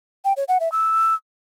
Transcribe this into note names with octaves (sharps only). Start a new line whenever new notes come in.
G5
C#5
F#5
E5
E6